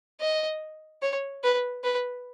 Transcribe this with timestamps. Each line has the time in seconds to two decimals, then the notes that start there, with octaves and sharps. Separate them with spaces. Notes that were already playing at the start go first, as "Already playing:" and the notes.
0.20 D#5
1.02 C#5
1.43 B4
1.84 B4